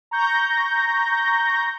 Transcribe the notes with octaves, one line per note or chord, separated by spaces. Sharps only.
A#5 C#6 G6 A#6